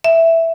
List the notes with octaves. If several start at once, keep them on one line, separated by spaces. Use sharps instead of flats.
E5